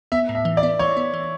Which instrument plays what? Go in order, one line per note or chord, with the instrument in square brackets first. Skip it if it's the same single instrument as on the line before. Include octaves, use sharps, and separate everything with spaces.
[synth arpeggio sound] B3 [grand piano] E5
[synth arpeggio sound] A2
[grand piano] E5
[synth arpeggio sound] E3
[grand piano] D5
[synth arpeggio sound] B3
[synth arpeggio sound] E3 [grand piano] C#5
[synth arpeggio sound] B3
E3